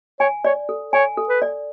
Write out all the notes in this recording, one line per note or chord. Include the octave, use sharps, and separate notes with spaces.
C#5 G#5
C#5 D5
A4
C#5 G#5
A4
B4
D5